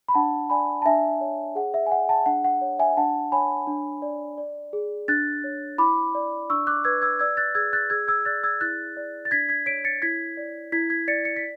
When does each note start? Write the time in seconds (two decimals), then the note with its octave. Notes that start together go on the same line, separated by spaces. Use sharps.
0.08 B5
0.14 D4 F#5 A5
0.50 D5 G#5 B5
0.82 A5
0.86 D4 E5 G#5
1.21 C#5
1.55 G#4 F#5
1.74 E5
1.86 G#5
1.91 D5 F#5
2.09 F#5 A5
2.26 D4 F#5
2.44 F#5
2.61 C#5
2.79 E5 G#5
2.97 D4 F#5 A5
3.32 C#5 G#5 B5
3.67 D4
4.02 D5
4.38 D5
4.73 G#4
5.08 D4 F#6 A6
5.44 C#5
5.78 E4 B5 D6
6.15 D5
6.50 D4 C#6 E6
6.67 D6 F#6
6.84 B4 E6 G#6
7.02 E6 G#6
7.19 D5 E6 G#6
7.37 F#6 A6
7.55 G#4 E6 G#6
7.73 F#6 A6
7.90 G#4 E6 G#6
8.08 E6 G#6
8.25 D5 F#6 A6
8.44 E6 G#6
8.61 E4 F#6 A6
8.97 D5
9.25 A6
9.31 D4 G#6 B6
9.49 G#6 B6
9.66 C#5 B6 D7
9.85 A6 C#7
10.02 E4 G#6 B6
10.37 D5
10.72 E4 G#6 B6
10.90 G#6 B6
11.08 D5 A6 C#7
11.25 C#7
11.36 B6